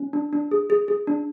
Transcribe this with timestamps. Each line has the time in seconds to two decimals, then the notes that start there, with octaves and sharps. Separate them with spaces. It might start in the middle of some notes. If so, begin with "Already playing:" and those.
Already playing: C#4
0.13 D4
0.33 D4
0.51 G#4
0.70 G#4
0.88 G#4
1.07 D4